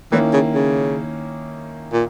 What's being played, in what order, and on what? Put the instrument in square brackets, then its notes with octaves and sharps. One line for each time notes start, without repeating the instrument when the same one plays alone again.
[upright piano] D#3 A#3 C#4 E4 [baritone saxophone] E3
[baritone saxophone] C#3
C#3
A#2